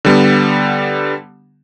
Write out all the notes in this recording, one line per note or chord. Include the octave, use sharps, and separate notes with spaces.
D3 G3 B3